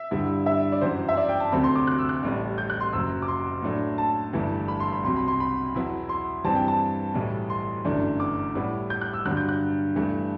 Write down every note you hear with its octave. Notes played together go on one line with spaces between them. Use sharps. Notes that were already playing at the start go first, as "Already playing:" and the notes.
Already playing: E5
G2 D3 G3 B3 E4
E5
D5
F#2 E3 B3 C5
E5
D5
G5
A5
D2 C3 F#3 A3 C4 B5
C6
D6
F#6
E6
F#6
A1 A2 G3
G6
F#6
C6
F#1 F#2 F#3 E6
D6
C6
A2 F#3 A3 D4
A5
G1 G2 E3 A3 E4
B5
C6
B5
C2 B2 F#3 C6
B5
C6
B5
E2 B2 F#3 B3 E4
C6
G2 E3 G3 C4 A5
G5
A5
B1 A2 E3 G3
C6
G1 F#2 E3 A3 D4
D6
A2 G3 B3 E4
G6
F#6
E6
G2 D3 F#3 F#6
G6
F#6
G2 E3 A3